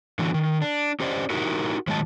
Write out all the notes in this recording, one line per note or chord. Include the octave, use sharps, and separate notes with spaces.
D3 E3 F#4
D#3
D4
C#4 G4 C5 D5 D#5
D#4 E4 F#4 G4 A#4
A2 D#3 F#3 G#3 D#5 A5